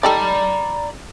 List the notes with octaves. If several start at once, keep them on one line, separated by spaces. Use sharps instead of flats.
D#4 G4 A4 D5 A#5 B5